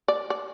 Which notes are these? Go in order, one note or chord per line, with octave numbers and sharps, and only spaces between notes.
D5
D5